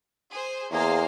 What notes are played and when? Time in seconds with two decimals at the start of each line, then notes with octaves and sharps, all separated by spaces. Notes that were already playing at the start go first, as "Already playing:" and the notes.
0.32 G#4 C5
0.71 E2 A#3 G#4 C5 F5